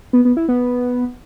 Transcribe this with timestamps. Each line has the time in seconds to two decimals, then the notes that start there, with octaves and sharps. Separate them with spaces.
0.13 B3
0.25 B3
0.37 E4
0.49 B3